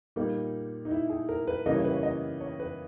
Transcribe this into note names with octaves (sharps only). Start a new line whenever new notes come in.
A#2 G3 A#3 D#4
D#4
E4
G#4
A#4
B4
C#3 E3 G3 A#3 D#5
C#5
B4
C#5
D#5
C#5
B4